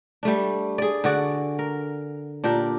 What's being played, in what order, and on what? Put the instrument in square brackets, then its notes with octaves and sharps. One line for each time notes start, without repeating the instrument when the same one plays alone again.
[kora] G3 A3 D4
G#4 D5
D3 F#4 D5
A#4
A#2 D4 G4 A#4